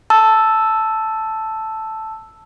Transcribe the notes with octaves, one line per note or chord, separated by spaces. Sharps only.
A5 E6